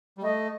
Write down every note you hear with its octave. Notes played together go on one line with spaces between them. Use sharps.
G3
A3 D#5